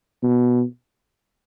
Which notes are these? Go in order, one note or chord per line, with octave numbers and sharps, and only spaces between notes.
B2